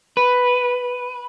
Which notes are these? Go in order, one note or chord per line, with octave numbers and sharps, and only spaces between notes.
B4